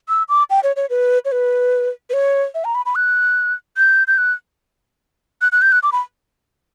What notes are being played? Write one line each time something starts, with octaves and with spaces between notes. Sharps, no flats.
E6
D6
G5
C#5
C#5
B4
C#5
B4
B4
C#5
E5
A#5
B5
B5
F#6
G6
G6
F#6
F#6
F#6
G6
F#6
D6
B5